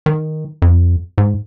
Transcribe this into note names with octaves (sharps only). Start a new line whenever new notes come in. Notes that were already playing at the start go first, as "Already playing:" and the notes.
D#3
F2
G#2